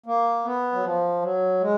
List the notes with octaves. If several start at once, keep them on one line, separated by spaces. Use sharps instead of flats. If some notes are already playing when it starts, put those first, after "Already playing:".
A#3
B3
F#3
F3
F#3
G#3